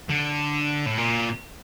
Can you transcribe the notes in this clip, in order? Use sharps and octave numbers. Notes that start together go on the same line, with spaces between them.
D3
A2
A#2